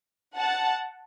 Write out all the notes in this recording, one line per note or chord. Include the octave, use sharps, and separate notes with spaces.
F#5 A5